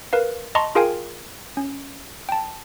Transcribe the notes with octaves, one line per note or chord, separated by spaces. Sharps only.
A#4 B4 F5
D#5 A5 A#5 C6 C#6
F4 G#4 A#4 F5 G5 G#5
C#4
G5 A5